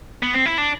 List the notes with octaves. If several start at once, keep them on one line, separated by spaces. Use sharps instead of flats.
B3
C4
E4
D4